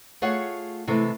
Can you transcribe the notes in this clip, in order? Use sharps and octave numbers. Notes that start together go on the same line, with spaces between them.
A3 F4 G#4 C#5 F#5
C3 E3 G#3 A3